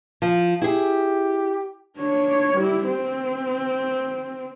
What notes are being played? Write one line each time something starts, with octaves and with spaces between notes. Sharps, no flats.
F3
E4 G4 G#4
D4 C#5
G3 E4
C4